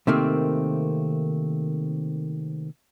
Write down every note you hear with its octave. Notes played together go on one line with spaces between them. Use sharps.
C3 D#3 A3 A#3 C4